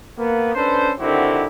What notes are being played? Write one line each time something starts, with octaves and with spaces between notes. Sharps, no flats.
A#3 B3
C#4 D4 A4 B4 C5
D3 D#3 C4 E4 F#4 G4